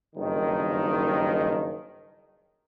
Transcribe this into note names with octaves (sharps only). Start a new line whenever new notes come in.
F#1 G2 D#3